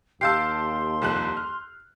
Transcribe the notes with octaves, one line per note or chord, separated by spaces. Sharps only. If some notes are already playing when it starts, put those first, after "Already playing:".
D#2 G4 F5 A5 C6 E6 G6 C7
C2 F2 F#6
F6